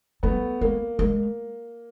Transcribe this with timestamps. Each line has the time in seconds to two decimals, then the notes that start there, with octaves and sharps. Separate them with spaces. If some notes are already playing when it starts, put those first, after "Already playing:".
0.23 G3 A3 B3
0.61 G#3 A#3
0.99 G#3 A#3